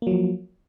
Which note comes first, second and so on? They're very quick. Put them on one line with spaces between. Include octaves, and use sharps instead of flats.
A#3 F#3 F3